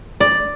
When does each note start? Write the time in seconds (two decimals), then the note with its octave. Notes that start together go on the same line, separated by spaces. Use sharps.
0.20 D5